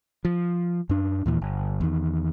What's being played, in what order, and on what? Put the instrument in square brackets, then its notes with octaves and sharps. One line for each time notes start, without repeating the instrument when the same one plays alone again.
[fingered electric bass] F3
F#2 D4
D#2 A#2 E3
G1
E2 D#3